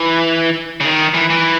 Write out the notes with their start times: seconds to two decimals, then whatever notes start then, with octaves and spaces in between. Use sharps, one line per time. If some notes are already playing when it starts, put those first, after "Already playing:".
Already playing: E3
0.80 C#3
0.85 D#3
1.14 E3
1.30 E3